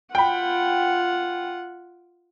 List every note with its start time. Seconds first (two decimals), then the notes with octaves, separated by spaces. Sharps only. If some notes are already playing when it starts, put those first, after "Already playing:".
0.15 F4 F#5 G5 B5